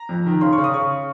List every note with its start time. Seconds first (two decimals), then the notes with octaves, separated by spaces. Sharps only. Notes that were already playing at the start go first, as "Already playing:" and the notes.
Already playing: A#5
0.09 F2
0.26 D#3
0.41 C#3 C6
0.53 C#6
0.58 C#3
0.64 D#6
0.74 C#3 C#6